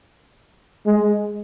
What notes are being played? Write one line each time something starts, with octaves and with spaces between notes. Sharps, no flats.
G#3